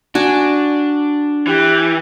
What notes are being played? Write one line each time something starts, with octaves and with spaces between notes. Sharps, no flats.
D4 F#4 G#5
E3 G4